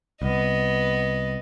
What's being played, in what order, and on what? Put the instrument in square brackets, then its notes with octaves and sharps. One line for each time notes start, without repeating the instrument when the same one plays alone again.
[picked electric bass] C2 [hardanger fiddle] B3 D#5